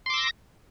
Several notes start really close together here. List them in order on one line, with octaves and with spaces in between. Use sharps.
C6 D6 E6 A#6